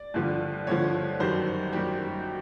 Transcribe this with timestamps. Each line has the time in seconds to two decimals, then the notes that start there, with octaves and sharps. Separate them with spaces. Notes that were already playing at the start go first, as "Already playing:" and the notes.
Already playing: D5
0.14 G2 D3 F3
0.67 G2 D3 F3 C#5
1.20 F#2 D#3 G3 C5
1.72 F#2 D#3 G3 G4